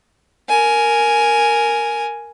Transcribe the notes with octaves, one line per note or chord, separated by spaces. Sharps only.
A#4 G#5